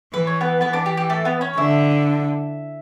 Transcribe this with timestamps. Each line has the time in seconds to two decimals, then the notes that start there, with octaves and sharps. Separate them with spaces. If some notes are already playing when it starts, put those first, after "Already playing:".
0.13 E3 B4
0.27 C#5
0.41 B3 B4
0.61 E3 B3 B4
0.73 D4 D5
0.86 G4
0.97 G4
1.10 A3 A4
1.25 B3 B4
1.41 C#4 C#5
1.58 D3 E4 E5